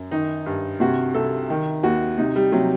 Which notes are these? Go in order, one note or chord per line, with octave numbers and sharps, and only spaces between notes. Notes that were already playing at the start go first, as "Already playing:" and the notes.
Already playing: F#2
D#3 D#4
G2
C3 F#4
C2 A4
D#3
D#2 F#4
C3 D#4
G3
C3 F#3